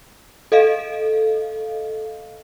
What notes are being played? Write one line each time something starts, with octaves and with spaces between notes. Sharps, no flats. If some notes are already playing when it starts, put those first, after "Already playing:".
A4 D#5 F5